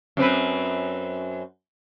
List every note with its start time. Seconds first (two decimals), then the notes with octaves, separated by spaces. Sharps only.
0.17 F#2 C4 B4